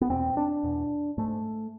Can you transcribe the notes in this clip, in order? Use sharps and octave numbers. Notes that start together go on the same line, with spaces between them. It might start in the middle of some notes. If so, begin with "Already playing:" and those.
B3
E2 B2 C4
D4
E2 B2
G#2 A3